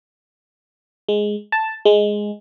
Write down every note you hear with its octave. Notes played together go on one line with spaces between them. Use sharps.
G#3
A5
G#3